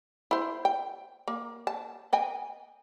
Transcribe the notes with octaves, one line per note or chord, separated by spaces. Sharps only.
E4 C5
G5
A#3
A5
D#5 G5 G#5